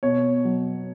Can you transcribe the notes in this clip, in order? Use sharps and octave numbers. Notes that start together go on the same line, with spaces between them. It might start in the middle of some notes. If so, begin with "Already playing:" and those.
B2 C#5
F#3